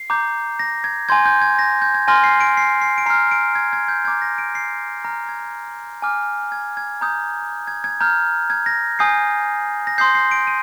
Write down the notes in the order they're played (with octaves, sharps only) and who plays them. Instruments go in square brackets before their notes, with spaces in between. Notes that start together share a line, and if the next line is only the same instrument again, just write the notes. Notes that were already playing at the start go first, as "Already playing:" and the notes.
Already playing: [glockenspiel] C7
A#5 D6 G6
A#6
G#6
G#5 C6 G6 G#6
G6
G#6
A#6
G6
G#6
G#5 C6 F6 A#6
C7
D7
C7
C7
D7
A#5 F6 C7
D7
G#6
G#6
G6
A#5 D6 G6 G#6
A#6
D7
C7
A#5 F6 A#6
G#6
G#5 D6 F6
G#6
G#6
A#5 D#6 G6
G#6
G#6
A#5 F6 G6
G#6
A#6
G#5 D#6 G6 C7
A#6
C6 D#6 G6 C7
C7
D7
D#7